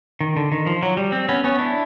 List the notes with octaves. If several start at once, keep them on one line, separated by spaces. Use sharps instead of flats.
D#3
D3
D#3
F3
F#3
G3
C4
B3 C#4
B3 C#4
D4 E4